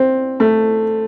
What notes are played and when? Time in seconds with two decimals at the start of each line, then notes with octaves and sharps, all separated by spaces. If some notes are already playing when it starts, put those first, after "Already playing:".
Already playing: C4
0.40 A3